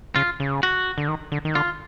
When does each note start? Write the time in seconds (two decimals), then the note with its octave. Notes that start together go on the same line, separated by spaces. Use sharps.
0.16 C#3 F4
0.40 C#3
0.63 F#4
0.98 D3
1.08 D#3
1.32 D3
1.45 D#3
1.55 D3 F4